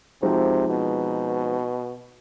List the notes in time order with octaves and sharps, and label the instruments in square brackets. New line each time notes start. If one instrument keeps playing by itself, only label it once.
[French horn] C3 [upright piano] F3 G#3 C4 D#4 F#4
[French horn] B2